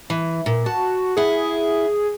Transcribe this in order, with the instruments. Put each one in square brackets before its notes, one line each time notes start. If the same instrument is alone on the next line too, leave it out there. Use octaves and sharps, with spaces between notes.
[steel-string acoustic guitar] E3
A#2
[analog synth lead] F#4 [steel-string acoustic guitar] A5
[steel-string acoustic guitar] E4 F#5 [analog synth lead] G#4